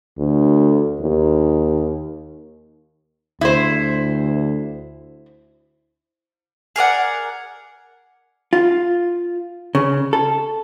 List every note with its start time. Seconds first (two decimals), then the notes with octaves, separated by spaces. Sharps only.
0.18 D2
1.00 D#2
3.41 D2 E4 C5
6.76 G#4 A#4 D5 F#5
8.53 F4
9.75 C#3
10.13 A4